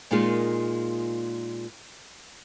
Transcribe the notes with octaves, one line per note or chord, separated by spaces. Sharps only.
A#2 G#3 A#3 D#4 F4 G#4